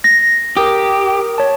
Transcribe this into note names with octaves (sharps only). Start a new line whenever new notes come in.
A#6
G4 A#4 D#6
C#5 A5